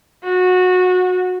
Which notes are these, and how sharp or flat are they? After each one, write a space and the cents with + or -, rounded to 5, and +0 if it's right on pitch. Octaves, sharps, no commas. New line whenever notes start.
F#4 -20